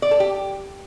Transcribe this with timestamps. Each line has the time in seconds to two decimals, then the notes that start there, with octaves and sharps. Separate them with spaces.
0.02 D5
0.11 A4
0.20 G4